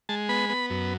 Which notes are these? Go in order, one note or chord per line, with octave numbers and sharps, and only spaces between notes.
G#3 A5
B3 B5
B3
F#2